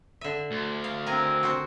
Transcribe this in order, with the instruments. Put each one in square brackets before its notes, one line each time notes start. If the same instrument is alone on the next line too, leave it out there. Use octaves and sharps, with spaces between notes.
[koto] D3 E5
[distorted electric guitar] D2
[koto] F5
[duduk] C4 [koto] A#4 G#5
[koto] F#4 C5